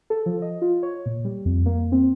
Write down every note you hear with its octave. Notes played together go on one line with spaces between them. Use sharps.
A4
F3
D#5
F4
C#5
A#2
G3
F2
A#3
C4